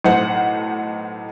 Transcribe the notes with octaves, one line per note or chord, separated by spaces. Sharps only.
B1 A2 C5 F#5